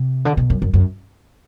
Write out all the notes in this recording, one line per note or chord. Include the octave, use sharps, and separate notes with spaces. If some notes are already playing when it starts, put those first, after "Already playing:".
Already playing: C3
D3
B2
F#2
F#2
F#2